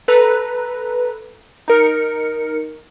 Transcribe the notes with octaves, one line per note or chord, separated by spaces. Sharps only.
A4 B4 A#5
D#4 A#4 C#7